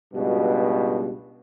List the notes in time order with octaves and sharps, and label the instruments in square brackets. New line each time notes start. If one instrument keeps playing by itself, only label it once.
[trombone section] C#2 G2 B2